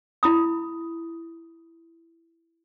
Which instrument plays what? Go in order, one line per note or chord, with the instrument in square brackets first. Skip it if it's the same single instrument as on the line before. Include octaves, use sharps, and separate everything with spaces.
[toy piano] E4 B5 D#6